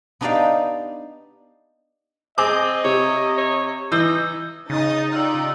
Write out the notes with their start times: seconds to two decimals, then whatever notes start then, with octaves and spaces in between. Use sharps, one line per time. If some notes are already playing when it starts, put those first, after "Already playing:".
0.21 B3 D4 D#4 G4 D5 F5
2.38 C4 G#4 D#5 D6
2.84 C3 C#5
3.38 C#5
3.92 E3 D#4 E6 G6
4.70 C#3 D#4 D#5 D#6 A6
5.13 F4 G4 D5 E6 F6